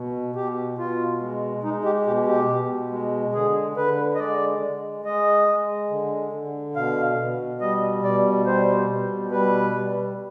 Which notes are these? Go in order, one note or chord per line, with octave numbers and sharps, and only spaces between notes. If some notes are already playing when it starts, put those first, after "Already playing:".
Already playing: B2
B2 G4
B2 F4
G#3
G#3 D#4
G4
B2 G4
G4
B2
G#3
D3 G#4
D3 B4
D#5
G#3 D5
G#3
G#3 D#5
G#3
D3
D3
B2 F5
B2
G3 D#5
B2 D5
G3 C5
B2
G3 B4
G3